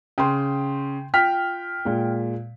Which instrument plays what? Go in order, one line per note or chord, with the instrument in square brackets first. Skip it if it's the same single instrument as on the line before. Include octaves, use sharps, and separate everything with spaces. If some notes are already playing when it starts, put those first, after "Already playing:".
[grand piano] C#3 [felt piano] G5 C6
[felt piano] F4 [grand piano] G5 F6 B6
[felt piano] A#2 G#3